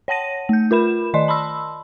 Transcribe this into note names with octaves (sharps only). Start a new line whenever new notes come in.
C#5 F#5 A5 A#6 D#7
A3 G6
F4 A#4 B5 E7
D#3 D5 D#5 C6
A5 B5 C6 E6